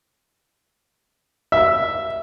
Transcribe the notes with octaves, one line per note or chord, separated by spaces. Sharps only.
E5